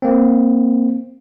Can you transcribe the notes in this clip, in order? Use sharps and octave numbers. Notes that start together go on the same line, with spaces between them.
A#3 C4